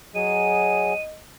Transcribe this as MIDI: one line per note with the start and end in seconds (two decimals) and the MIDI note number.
0.15 0.93 54
0.15 0.93 68
0.15 1.18 75
0.15 1.01 99